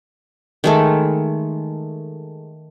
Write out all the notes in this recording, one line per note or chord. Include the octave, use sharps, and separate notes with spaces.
D#3 G#3 A3